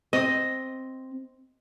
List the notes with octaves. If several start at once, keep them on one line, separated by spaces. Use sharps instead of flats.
C4 D#5